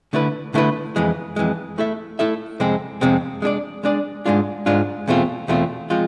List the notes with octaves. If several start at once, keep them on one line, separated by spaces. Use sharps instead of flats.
D3 A3 E4 B4
D3 A3 E4 B4
F2 E3 G#3
F2 E3 G#3
A3 E4 A4 E5
A3 E4 A4 E5
F2 C3 G#3 C4
F2 C3 G#3 C4
G#3 D4 G#4 D5
G#3 D4 G#4 D5
G#2 G#3 D4 F4
G#2 G#3 D4 F4
E2 B2 A3 C4 F4
E2 B2 A3 C4 F4
F3 G#3 C4 F4